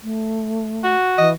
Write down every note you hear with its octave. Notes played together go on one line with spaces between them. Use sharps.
A3
F#4
E3 D#5